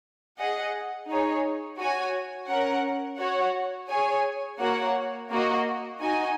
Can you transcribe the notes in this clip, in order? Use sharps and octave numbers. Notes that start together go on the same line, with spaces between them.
G#4 D#5 F#5
D#4 G#4 C#5
F#4 C#5 G#5
C#4 A#4 F#5
F#4 C#5 F#5
G#4 C#5 G#5
A#3 F#4 C#5 F#5
A#3 F#4 D#5
D#4 F#4 D#5 G#5